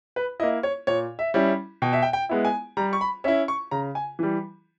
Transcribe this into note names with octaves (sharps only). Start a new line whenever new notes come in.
B4
A#3 E4 D#5
C#5
A#2 C#5
E5
G3 C#4 E4
B2 G5
E5
G5
G5
G#3 B3 E4
G#5
G3 A#5
C#6
B5
C#4 E4 E5
C#6
C#3 A#5
G#5
E3 G3